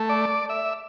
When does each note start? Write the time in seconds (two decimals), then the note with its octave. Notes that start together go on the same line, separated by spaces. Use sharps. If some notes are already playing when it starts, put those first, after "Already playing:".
Already playing: A3
0.09 D5
0.49 E5